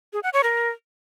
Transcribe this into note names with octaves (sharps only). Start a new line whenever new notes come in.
G#4
F#5
C#5
A#4